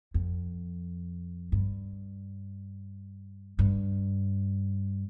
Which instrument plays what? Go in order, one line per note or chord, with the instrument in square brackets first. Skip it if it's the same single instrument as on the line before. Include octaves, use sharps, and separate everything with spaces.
[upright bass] F2
G2
G2